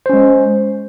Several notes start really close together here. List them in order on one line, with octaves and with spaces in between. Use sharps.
C5 C#4 G#3